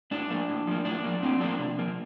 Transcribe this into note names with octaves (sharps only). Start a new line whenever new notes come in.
A2 D4
F3 A#3
A2
F3 A#3
A2 D4
F3 A#3
A2 C4
F3 A#3 D4
C3
F3 A#3